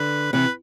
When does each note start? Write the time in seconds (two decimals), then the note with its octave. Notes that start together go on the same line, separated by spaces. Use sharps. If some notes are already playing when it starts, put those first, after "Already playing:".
Already playing: D3 B4
0.33 C3 E3 B4